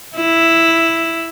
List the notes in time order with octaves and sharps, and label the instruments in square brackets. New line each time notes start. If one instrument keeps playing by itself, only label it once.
[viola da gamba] E4